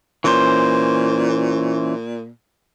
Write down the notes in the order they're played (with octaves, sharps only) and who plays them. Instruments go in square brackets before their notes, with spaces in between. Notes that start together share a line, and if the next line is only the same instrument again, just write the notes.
[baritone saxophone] A#2 [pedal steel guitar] E3 C#4 C5